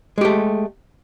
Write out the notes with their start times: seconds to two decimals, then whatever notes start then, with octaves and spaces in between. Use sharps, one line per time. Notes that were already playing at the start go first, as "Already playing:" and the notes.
0.18 G#3
0.21 G4
0.25 A3